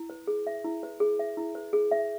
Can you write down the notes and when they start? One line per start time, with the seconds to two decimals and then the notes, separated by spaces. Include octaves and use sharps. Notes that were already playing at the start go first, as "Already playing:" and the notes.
Already playing: E4
0.10 B4
0.27 G#4
0.47 E5
0.64 E4
0.83 B4
1.00 G#4
1.19 E5
1.37 E4
1.55 B4
1.73 G#4
1.91 E5